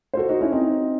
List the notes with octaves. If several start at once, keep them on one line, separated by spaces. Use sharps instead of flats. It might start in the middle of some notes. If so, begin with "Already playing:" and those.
C5
F#4 A4
D#4 F#4
C#4 E4
C4 D#4